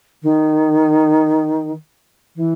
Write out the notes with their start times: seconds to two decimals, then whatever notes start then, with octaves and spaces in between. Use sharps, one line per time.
0.22 D#3
2.35 E3